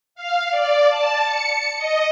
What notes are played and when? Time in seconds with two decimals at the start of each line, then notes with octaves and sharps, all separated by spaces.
0.15 F5
0.50 D5
0.89 A5
1.23 C#7
1.78 D#5